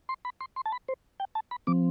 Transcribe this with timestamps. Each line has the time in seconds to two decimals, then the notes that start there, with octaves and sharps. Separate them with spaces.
0.09 C6
0.25 B5
0.41 C6
0.56 C6
0.66 A5
0.72 B5
0.88 C5
1.20 G5
1.35 A5
1.51 B5
1.67 F3 C4 D6